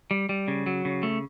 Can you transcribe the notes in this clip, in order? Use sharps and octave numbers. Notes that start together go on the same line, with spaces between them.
G3
G3
C#3
F#3
C#3
A3